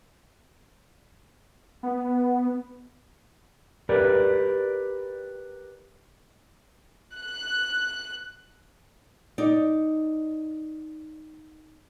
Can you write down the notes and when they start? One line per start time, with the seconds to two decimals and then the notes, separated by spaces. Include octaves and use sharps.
1.83 B3
3.89 G4 A#4 B4 D5
7.17 F#6
9.38 D#4 D5